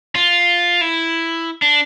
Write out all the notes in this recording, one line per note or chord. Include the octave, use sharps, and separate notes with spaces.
F4
E4
D4